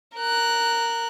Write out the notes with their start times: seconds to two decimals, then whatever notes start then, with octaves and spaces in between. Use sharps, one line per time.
0.17 A#4 F#6